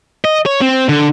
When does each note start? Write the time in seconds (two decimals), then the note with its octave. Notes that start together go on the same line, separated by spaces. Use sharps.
0.25 D#5
0.46 C#5
0.61 C4
0.89 D3